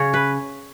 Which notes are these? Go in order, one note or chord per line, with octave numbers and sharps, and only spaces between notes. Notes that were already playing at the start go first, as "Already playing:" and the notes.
Already playing: C#3 C#5
B4